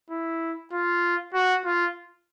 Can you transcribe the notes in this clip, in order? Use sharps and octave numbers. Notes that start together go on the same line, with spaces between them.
E4
F4
F#4
F4